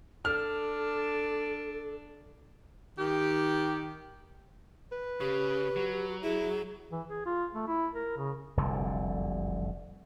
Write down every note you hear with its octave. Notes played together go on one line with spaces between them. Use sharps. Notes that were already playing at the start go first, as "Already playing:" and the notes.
D4 A4 F6
D#3 G4
B4
C#3 G4
F#3
E4 G#4
E3
G#4
F4
A3
E4
A#4
C#3
F1 C2 F#2 D3